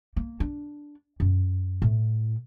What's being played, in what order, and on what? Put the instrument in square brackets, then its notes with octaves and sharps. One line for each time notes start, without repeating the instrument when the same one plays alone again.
[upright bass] A#3
D4
F#2
A2